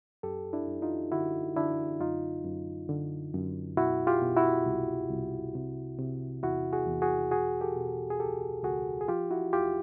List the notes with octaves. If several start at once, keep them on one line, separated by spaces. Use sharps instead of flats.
F#2 G4 A4
D4 E4
F#2
D#4 F4
D3 E4 F#4
D3 D4 E4
F#2 D#4 F4
F#2
D3
F#2
B2 E4 F#4
F4 G4
B2
E4 F#4
C2
C2
C3
C3
E2 E4 F#4
F#4 G#4
E2
F#4 G#4
B2 F#4 G#4
G4 A4
B2
G#4
C#2 G4 A4
C#2 F#4 G#4
G#4
F3 F4 G4
E4 F#4
E2 F4 G4